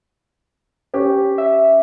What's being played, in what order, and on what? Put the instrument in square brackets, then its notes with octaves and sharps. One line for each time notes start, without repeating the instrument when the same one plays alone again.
[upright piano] C#4 G4
[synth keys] E5